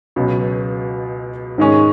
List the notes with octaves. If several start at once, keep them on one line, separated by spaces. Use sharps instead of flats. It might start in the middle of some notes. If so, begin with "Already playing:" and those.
C#2 B2 F#3 B3
G#2 D#3 G#3 C#4 G#4